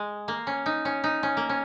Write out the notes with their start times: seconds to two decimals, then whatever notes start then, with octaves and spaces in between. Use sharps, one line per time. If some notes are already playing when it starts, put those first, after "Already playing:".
Already playing: G#3
0.28 A#3
0.47 C#4
0.66 D#4
0.85 C#4
1.04 D#4
1.23 C#4
1.37 A#3
1.49 C#4